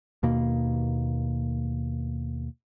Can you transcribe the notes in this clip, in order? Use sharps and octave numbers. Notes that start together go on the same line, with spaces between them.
D#2 B2 A#3